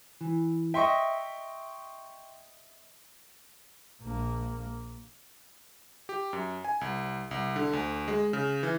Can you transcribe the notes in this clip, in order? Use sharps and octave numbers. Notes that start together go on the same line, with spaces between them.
E3
D#5 E5 G5 C6 C#6
A#1 A#3
G4
F#2
G#5
C2
C2
D3
D2
G#3
C#3
E3